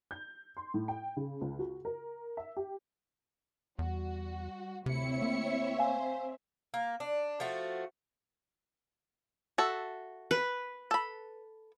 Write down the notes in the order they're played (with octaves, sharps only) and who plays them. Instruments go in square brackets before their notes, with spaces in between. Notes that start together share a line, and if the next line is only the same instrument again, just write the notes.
[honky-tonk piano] G6
C6
A2
G5
C#3
C#2
F#4
A#4
E5
G4
[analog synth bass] E2 [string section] G3 F#4
[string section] D2 E4 C#7 [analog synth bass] C3 [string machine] C4 C#5 E5
[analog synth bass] A#3
[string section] C5 [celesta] F5 G#5
[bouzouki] A#3
D4
F3 A3 F#4
[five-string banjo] F#4 A4 E5
[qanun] B4
[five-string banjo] A4 B5